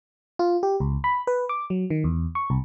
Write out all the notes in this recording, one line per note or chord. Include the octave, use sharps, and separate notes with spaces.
F4
G4
C#2
B5
B4
D6
F#3
D#3
E2
C#6
C2